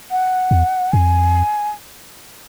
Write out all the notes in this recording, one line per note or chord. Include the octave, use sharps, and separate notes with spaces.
F#5
E2
F2 G#5